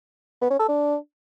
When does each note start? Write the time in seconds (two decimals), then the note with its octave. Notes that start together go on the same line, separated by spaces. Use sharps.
0.41 B3
0.51 C#4
0.60 A4
0.69 D4